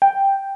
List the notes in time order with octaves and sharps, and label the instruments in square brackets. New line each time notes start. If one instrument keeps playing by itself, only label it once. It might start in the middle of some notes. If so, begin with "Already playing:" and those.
[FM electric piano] G5